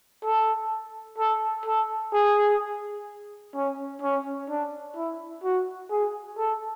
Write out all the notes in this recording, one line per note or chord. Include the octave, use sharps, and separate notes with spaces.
A4
A4
A4
G#4
C#4
C#4
D4
E4
F#4
G#4
A4